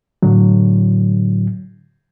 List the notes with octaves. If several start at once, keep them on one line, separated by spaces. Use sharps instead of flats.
A2 D3 F#3